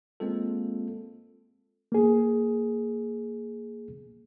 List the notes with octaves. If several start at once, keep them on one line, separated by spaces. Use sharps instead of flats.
G#3 A#3 C4 F4 A4
A#3 G#4